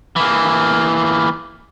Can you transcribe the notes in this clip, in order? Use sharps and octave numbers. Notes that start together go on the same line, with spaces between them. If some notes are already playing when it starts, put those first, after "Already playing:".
E3 A#3